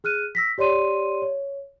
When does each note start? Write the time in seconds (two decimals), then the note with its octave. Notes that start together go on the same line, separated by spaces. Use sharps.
0.04 G#4 F6 F#6 D#7
0.35 E6 A#6 B6
0.58 G4 C#5 D5 C6 D#7
1.22 C#5